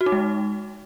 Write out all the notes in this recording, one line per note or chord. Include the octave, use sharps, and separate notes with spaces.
F#4
D#4
G#3